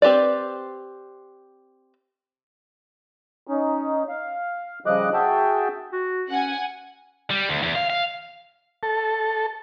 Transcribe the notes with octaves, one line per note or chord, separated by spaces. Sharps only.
C4 G4 B4 D5
C#4 D#4
F5
C#3 F3 G3 D#5 D6 F#6
F#4 G#4 E5 G5 A5
F#4
C#4 F#5 G#5
G3
D2
E2
F5
F5
A4